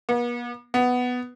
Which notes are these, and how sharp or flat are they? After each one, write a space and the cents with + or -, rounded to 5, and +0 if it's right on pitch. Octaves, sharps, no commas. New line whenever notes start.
B3 -45
B3 +5